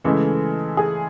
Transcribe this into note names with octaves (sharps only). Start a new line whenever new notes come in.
C#3 E3 G#3 A3 A4
G#4